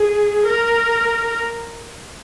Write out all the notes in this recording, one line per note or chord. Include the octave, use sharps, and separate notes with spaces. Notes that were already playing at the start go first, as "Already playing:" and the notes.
Already playing: G#4
A#4